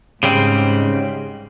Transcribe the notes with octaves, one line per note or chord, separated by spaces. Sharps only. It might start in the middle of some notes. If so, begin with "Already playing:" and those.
G#2 C#3 G3 C4